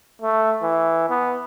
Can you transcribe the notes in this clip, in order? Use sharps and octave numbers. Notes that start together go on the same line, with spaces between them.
A3
E3
B3